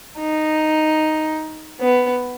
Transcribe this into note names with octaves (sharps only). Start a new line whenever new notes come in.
D#4
B3